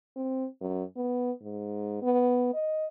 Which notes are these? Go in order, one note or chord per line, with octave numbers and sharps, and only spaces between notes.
C4
F#2
B3
G#2
B3
D#5